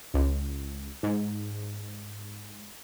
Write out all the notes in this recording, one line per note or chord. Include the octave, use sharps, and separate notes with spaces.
C#2
G#2